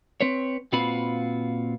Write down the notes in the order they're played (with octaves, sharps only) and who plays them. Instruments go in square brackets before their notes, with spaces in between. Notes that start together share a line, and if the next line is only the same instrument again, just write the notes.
[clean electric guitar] C4 B4 C#5
A#2 C4 F4 F#4 B4 B5